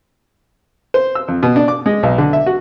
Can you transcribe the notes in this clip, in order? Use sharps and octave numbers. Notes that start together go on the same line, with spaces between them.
C5
E6
F2
B2
D4
D6
G#3
B1
D3
E5
F#4